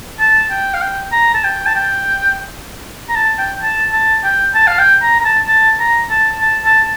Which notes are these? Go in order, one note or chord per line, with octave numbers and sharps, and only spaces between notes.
A5
G5
F5
G5
A#5
A5
G5
A5
G5
A#5
A5
G5
A5
A5
G5
A5
F5
G5
A#5
A#5
A5
A5
A#5
A5
A5
A5